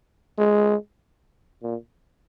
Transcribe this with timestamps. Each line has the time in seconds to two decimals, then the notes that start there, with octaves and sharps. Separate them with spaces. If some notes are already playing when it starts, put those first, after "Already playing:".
0.38 G#3
1.63 A#2